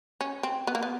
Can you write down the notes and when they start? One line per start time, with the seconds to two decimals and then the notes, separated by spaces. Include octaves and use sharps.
0.21 C#4
0.43 C4
0.67 B3
0.75 A#3
0.83 B3